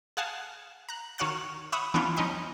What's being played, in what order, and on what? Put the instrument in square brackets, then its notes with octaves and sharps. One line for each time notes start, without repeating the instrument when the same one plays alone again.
[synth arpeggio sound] G#4 F5 F#5 G#5 A5
A#5 F#6
D#3 F#4 C#5 F5 F#6 A6
C#5 E5 F#5 B5 D#6
E3 B3 C#4 D4 E4 F4
F3 C#4 D#4 D#5 G5 B6